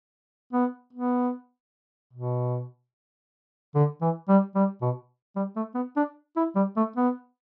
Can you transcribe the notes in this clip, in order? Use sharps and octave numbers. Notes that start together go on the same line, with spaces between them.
B3
B3
B2
D3
E3
G3
G3
B2
G3
A3
B3
D4
E4
G3
A3
B3